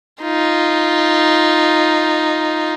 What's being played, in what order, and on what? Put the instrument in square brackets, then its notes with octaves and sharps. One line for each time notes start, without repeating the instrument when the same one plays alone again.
[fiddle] D#4 F4